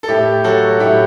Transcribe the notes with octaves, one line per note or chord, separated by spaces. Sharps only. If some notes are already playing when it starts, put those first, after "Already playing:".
A4
A2 E4 G4
F#3 F#4 A4
A2 E4 G4